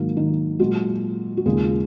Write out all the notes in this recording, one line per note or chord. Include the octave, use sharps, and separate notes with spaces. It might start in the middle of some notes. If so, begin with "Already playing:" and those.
Already playing: G#2 D#3 F#3 A#3
D#3 D#4
A#2 F#3 G#3 F#4
F#4
D#2 C#3 F3 G#3 G#4